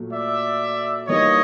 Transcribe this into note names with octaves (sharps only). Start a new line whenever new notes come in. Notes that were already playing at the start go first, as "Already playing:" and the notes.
Already playing: A#2 F#3 A3
D5 E5
E3 G3 A#3 D#4 C#5 D#5